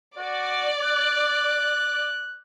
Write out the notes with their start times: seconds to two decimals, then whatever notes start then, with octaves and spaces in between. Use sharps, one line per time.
0.18 F#4 D5
0.85 F#6